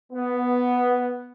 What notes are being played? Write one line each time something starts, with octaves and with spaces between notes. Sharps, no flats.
B3